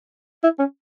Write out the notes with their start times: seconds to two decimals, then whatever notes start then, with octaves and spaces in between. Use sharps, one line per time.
0.44 E4
0.59 C#4